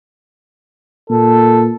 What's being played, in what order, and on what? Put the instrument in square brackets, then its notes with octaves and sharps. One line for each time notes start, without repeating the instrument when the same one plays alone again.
[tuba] A#2 [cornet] A4